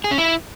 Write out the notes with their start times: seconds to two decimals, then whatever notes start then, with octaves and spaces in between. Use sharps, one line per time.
0.04 G#4
0.11 C#4
0.18 E4